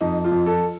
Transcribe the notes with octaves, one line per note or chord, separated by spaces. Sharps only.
F2 D#4
F4
F2
A4